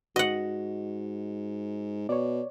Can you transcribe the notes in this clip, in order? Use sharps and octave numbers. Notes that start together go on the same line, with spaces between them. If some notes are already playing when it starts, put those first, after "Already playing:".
G#2 F#4 D#5 F#5
B2 C#5 D5